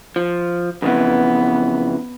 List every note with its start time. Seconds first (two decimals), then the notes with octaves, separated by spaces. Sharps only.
0.16 F3
0.82 F2 C#3 E3 B3